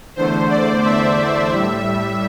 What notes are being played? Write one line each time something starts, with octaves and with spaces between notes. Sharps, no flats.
E2 D3 A3 C5
D5
E5
A2 G3